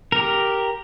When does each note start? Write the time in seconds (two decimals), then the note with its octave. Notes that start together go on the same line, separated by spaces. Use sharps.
0.12 G4 A#4